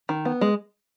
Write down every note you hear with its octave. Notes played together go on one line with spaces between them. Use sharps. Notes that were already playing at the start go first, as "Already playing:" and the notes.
D#3
B3
G#3